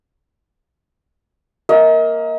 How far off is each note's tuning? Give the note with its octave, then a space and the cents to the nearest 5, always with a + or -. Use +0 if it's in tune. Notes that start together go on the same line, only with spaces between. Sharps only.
A#3 +0 D#5 +40